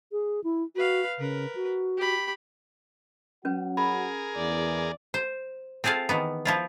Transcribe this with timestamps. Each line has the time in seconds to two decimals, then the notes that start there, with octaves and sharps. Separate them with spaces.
0.12 G#4
0.44 E4
0.75 F#4 B4 F5
1.18 C#3 A#4 B4
1.55 F#4
1.97 G4 B5
3.45 F#3 C#4 F#4 B4 F#5
3.77 G#4 A#4 B5
4.36 E2 D5
5.14 C5
5.84 C4 F4 G#4 A4 F5
6.09 D#3 E3 B3
6.45 F3 E4 F4